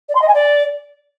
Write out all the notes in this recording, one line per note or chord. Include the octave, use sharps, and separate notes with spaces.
D5
C6
D#5
G#5
D5